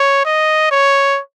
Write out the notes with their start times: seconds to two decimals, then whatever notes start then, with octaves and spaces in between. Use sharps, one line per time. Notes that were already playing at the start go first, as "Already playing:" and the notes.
Already playing: C#5
0.26 D#5
0.71 C#5